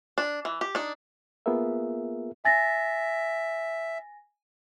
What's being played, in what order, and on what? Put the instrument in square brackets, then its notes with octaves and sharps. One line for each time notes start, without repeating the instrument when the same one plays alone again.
[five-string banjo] D4
E3
G4
D4 D#4
[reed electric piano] A#3 B3 F4 G#4 A#4 E5
[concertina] E5 [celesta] G#5 A6 A#6